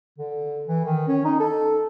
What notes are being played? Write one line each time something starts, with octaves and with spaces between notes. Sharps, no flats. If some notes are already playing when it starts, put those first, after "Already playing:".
D3
E3
D#3
C#4
D#4
A4